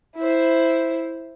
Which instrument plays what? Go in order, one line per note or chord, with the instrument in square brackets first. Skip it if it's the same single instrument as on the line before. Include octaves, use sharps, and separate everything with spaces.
[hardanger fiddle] E4 C5